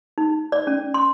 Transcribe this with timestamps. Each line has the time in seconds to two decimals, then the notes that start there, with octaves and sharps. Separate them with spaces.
0.18 D#4
0.52 D5
0.67 C#4
0.94 C6